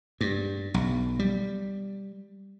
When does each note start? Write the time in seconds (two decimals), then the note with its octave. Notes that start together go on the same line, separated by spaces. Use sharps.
0.21 G2
0.74 B1
1.19 G3